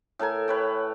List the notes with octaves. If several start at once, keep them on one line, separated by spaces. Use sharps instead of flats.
A2 A4 A#4 G#5
B4 C#5 G5